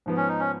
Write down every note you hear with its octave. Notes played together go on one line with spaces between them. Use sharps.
G#2 F3 B3
C#4
D#4
C#4